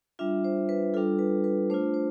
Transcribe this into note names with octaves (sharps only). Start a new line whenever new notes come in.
G3 D4 F4 E5
C5
B4
G3 D4 F4 A4
B4
B4
A3 D4 F4 C5
C5